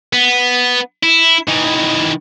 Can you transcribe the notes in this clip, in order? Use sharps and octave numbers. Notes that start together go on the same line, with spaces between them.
B3
E4
D#3 E3